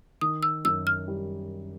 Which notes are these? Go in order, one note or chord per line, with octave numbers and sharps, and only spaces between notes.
D#3 D#6
E6
F#2 E6
F6
G3